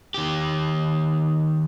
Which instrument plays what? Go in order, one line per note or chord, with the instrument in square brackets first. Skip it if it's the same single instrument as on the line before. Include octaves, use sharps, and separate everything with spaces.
[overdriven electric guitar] D#3 G4